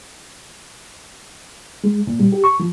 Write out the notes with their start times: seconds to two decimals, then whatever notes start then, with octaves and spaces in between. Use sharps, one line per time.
1.84 G#3
2.07 A#2
2.20 G3
2.32 G4
2.44 C#6
2.60 F3